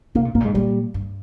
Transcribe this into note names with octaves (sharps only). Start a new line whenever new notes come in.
C3 A#3
A#2
G#2 A#3
A#2
G#2 G#3
A#2 G3
G2